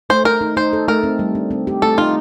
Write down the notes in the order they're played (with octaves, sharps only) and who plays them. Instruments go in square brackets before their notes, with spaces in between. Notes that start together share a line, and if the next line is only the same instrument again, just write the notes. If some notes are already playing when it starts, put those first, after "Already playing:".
[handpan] A3 [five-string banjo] C5
[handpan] A3 [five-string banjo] A#4
[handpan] D#4
[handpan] D#4 [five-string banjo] C5
[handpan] A4
[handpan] A3 [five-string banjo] A#4
[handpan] C4
G3
D4
C4
G4
[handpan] A3 [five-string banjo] A4
[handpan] D#4 [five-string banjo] F4